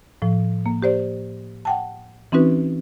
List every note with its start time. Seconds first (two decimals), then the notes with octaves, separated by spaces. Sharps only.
0.22 A2 F3
0.66 A#3
0.82 G4 C5 D5
1.65 F#5 G5 A5
2.32 E3 C4 C#4 D#4 F#4 B4